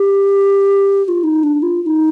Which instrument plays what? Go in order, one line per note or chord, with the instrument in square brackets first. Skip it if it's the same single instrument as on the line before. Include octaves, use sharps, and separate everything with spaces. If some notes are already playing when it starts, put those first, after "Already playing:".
Already playing: [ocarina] G4
G4
F4
D#4
D4
F4
F4
D#4